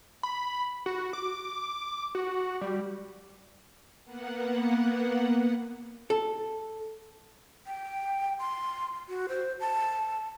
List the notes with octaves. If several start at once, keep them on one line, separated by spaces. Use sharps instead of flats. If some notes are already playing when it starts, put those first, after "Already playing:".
B5
F#4
D6
F#4
G3
A#3 B3 F#5
A4
G5
C6
F#4
C5
A5